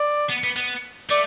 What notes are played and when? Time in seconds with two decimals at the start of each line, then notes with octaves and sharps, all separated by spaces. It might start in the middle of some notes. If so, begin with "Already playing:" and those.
Already playing: D5
0.30 B3
0.44 B3
0.57 B3
1.10 A3 D5